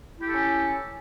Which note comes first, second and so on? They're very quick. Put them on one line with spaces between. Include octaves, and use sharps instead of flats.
E4 G4 A4 C#4